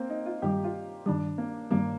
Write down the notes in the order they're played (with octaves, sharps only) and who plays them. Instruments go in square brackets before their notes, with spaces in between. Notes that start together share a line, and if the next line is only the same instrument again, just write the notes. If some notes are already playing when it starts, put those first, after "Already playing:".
Already playing: [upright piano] A#3 C4
D#4
F4
[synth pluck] G2 D#3 G3 [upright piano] G4
[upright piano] F4
[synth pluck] G2 D#3 G3 [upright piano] D4
[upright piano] A#3
[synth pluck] G2 D#3 G3 [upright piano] A#3